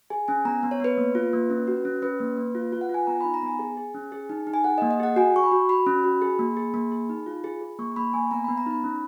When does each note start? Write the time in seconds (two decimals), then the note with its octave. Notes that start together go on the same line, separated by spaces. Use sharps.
0.10 G#4 G#5
0.28 C#4 G#5
0.45 B3 A#5
0.63 B3
0.71 C#5
0.80 B3 B4
0.98 A#3
1.15 F4
1.33 A#3
1.50 C#4
1.67 F#4
1.85 C#4
2.02 C#4 B4
2.20 A#3
2.37 A#3
2.55 F4
2.72 F4
2.81 F#5
2.89 F4
2.94 G#5
3.07 B3 A#5
3.21 D#4 B5
3.34 A#5
3.43 B3 G#5
3.59 G#4
3.77 G#4
3.94 C#4
4.12 G#4
4.29 D#4
4.47 D#4
4.54 G#5
4.64 G#4 F#5
4.78 D#5
4.82 A#3
4.91 D#5
5.00 G#4 F#5
5.16 F#4 G#5
5.34 F#4 C#6
5.43 B5
5.52 F#4
5.69 F#4 B5
5.86 C#4
6.04 F#4
6.22 G#4
6.39 A#3
6.57 G#4
6.74 A#3
6.92 G#4
7.09 D#4
7.26 F4
7.44 G#4
7.61 G#4
7.79 A#3 C#6
7.92 C#6
7.96 A#3 B5
8.14 A#3 G#5
8.31 B3 A#5
8.44 B3 B5
8.58 A#5
8.66 D#4 B5
8.84 C#4